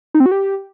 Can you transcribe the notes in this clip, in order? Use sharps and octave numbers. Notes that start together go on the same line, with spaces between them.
D#4
C4
F#4
G4